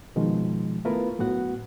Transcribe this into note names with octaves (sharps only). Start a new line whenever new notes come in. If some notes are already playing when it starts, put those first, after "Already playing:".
B2 D#3 F3 G#3
A3 B3 E4 F4 A#4 B4
F#2 A2 B3 F#4 F#5